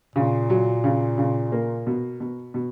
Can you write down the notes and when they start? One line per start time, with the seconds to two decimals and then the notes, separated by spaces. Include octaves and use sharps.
0.16 A#2 C#3
0.50 F#3
0.84 C#3
1.18 C#3
1.52 A#3
1.87 B2
2.20 B2
2.54 B2